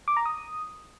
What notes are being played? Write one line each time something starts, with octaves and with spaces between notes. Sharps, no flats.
D6
A#5
D#6